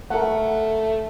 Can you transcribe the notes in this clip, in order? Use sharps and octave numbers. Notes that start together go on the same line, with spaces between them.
A3 A#4 F#5